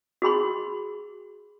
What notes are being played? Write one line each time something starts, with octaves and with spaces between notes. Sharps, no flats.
F#4 G#4 B5 C6